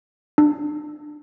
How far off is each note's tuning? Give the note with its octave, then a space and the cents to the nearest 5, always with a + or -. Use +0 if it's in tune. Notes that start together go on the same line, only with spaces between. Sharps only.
D4 +30